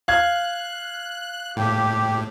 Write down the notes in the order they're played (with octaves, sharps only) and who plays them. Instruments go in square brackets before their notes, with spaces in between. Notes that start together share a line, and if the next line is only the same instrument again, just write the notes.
[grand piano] F5 G#6 [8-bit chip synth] F#6
[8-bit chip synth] A2 [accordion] G4